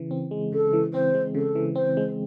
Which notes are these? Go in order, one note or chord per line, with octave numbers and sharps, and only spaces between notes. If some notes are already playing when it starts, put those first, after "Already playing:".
Already playing: C#3 E3
C4
G#3
C#3 A4
E3
C4 C5
G#3
C#3 A4
E3
C4 C5
G#3